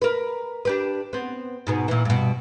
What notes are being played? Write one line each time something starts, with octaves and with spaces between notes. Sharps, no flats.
A#4 B4
D4 G4 B4
B3 C4
G#2 B2 B3
A#2 E3
G2 B2